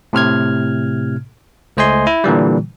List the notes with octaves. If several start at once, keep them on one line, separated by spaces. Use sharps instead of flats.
A2 C3 F6 G#6
C#2 A3 C5 D#5 G#5 C6
E4
A#2 D3 E3 G3